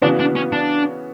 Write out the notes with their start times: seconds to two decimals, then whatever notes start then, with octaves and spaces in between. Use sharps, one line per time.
0.02 C#3 E3 B3 D4 F#4
0.19 D4
0.36 C#4
0.52 D4